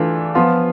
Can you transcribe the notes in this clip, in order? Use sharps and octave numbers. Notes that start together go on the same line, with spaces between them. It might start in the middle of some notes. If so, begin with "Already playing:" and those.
Already playing: E3 A3 D4 F4
F3 B3 F4